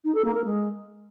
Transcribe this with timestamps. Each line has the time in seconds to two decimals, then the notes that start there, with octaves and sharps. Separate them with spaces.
0.04 D#4
0.14 A4
0.24 A#3
0.34 A#4
0.44 G#3